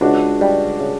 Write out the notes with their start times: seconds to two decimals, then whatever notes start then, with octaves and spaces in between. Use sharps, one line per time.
0.01 C#2 D4 F#4
0.41 G3
0.80 C#3